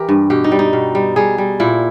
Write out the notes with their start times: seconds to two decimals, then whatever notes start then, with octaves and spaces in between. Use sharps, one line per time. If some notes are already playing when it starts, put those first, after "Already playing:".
Already playing: E3 G4 A#4
0.09 G2
0.30 B2 G4
0.44 D#4
0.52 G3
0.59 D#4
0.73 B2
0.95 G3
1.16 G3 G#4
1.38 G3
1.60 A#2 E4